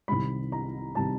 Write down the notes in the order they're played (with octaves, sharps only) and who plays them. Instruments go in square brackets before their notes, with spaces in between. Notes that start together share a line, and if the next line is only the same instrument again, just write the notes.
[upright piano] C2 C3 D#3 G3 B5
A#5
C3 D#3 G3 A5